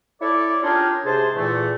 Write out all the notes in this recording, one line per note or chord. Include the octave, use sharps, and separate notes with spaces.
E4 A4 C#5 D5
C#4 D4 F4 G4 G#4 A#4
G#2 C3 G#4 C5 A5
E2 A#2 E3 A3